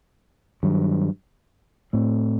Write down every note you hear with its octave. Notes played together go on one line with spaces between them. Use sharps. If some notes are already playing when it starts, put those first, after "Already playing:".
G2 D#3 F#3
A2 A3 C4